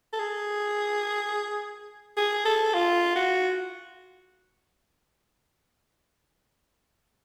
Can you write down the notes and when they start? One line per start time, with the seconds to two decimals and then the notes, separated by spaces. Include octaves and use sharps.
0.13 A4
0.19 G#4
2.17 G#4
2.45 A4
2.74 F4
3.16 F#4